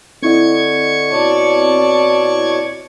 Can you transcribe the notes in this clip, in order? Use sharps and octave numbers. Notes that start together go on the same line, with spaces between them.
D3 C4 E4 D#5 C#6 G#6
B2 C#5 D5 A5